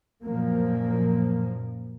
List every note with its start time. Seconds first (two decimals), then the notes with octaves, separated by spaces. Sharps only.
0.25 F#2 A#2 F3 A#3